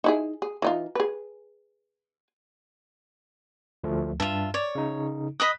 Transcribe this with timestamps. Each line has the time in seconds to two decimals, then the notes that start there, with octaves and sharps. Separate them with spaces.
0.04 D#4 E4 G#4
0.42 G#4
0.62 E3 D#4 F4
0.95 G#4 B4
3.84 D2 F3 A3
4.20 G2 F4 E5 A5
4.54 C#5 D5
4.75 C#3 D#4
5.40 D#5 B5 D#6 F#6 B6